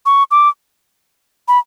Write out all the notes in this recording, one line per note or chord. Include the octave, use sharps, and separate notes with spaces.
C#6
D6
B5